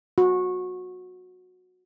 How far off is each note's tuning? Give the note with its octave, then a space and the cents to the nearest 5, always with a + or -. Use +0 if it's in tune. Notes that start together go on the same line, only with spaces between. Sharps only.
F#4 -20